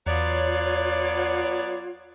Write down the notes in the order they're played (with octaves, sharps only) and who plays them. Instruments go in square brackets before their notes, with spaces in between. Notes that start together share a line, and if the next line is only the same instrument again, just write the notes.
[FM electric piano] E2 [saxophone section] F#3 B3 D5 [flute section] F4 C#5